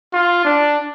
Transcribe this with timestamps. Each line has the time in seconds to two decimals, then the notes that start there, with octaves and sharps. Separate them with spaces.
0.13 F4
0.45 D4